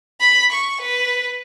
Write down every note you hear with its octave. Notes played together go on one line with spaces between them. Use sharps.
B5
C#6
B4